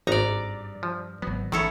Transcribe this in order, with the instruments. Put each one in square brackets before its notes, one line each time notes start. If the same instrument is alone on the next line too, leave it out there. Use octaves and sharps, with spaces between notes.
[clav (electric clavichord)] G#1 D#4 [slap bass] G2 [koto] D5 A#5
[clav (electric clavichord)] F3
[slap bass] G#1 F#3 [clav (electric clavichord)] B3
[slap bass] A1 [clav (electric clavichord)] D#3 [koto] E4 A4 C#5